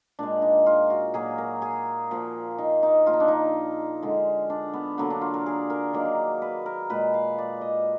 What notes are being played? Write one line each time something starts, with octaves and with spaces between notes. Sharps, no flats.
A#2 G#3 D4
D#4
F4
F#4
A#2 F#3 A#3 G#4
A#4
G#4
A#2 F3 A#3
D#4
D#4
A#2 F3 A#3 F4
D#4
D4
D#4
D3 G#3
D4
B3
D3 F#3 A#3 B3
D4
F4
A#4
G#4
A#4
D#3 F#3 A#3
B4
A#4
A#2 G#3 B4
F5
D5
D#5